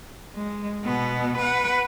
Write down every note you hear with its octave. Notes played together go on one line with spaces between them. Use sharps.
G#3
B2 B3
B4 F#5